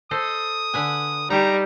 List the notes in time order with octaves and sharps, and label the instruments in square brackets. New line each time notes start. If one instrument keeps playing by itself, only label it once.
[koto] A4 C5 D#5 [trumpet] D#6
[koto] D3 B4 G#5
[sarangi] G3 [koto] D#4 G4 [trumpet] A#5